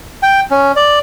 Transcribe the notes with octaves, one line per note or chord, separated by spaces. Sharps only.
G5
C#4
D5